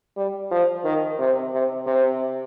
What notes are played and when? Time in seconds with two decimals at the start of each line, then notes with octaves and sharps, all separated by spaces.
0.17 G3
0.51 F3
0.85 D#3
1.19 C3
1.53 C3
1.87 C3